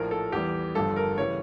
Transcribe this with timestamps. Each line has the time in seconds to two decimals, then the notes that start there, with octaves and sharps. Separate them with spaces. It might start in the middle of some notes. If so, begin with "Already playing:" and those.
Already playing: A#1 A2 F3 A#4
0.11 A4
0.32 E2 E3 G3 G4
0.75 G1 G2 F3 A4
0.96 A#4
1.18 C#3 E3 G3 C#5